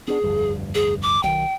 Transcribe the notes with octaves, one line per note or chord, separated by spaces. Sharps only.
B3 D4 G#4
F1 D2 G2
G#4
D6
B1 D#3 G5